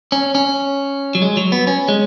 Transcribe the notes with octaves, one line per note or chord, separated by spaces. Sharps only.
C#4
C#4
F#3
G#3
F#3
B3
C#4
G#3